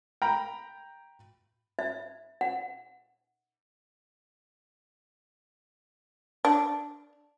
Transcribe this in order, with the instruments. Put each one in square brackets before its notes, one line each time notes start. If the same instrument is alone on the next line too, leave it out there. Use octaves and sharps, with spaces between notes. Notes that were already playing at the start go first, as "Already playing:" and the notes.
[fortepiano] G5 A#5 B5
[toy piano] E5
F#5
[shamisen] D4